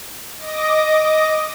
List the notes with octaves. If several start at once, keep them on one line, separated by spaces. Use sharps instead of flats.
D#5 D6 A#6